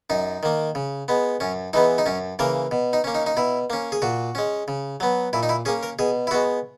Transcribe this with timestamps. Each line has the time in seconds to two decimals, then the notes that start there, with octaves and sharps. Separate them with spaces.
0.10 F#2 D#4
0.43 D#3 A#3
0.75 C#3
1.08 G#3 B3
1.40 F#2 C#4
1.73 E3 G#3 B3 D#4
1.98 D#4
2.06 F#2 C#4
2.39 C#3 E3 A#3 A#4
2.71 B2
2.93 D#4
3.04 A#3 C#4
3.15 D#4
3.26 D#4
3.37 B2 E4
3.70 A#3 C#4
3.92 G#4
4.02 A#2 F#4
4.35 G#3 C#4
4.68 C#3
5.00 F#3 B3
5.33 A#2 E4
5.43 D#4
5.49 E4
5.65 A#3 C#4 G#4
5.83 A#4
5.99 B2 G#4
6.27 E4
6.31 G#3 B3 F#4